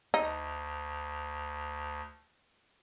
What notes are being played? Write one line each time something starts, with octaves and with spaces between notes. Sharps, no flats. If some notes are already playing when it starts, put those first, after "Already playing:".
D2 D#4